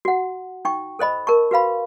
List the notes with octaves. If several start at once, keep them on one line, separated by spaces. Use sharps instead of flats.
F#4 F#5
D#4 G5 C#6
A4 C5 D#5 B5
A#4 A5 C#6
F#4 B4 F5 B5